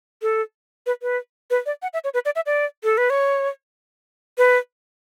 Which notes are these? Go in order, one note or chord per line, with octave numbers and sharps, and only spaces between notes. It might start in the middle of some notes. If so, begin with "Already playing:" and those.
A4
B4
B4
B4
D5
F#5
E5
C#5
B4
D5
E5
D5
A4
B4
C#5
B4